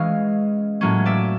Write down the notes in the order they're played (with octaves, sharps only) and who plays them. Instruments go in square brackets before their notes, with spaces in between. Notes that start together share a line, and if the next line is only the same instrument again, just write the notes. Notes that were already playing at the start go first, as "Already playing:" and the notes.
Already playing: [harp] E3 G#3 C#4 D#5 F5
A2 F#3 A#3 C#4
D5 E5